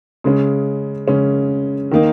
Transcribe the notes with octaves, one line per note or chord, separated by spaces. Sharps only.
C#3 G#3 C#4
C#3 G#3 C#4
D#3 A#3 D#4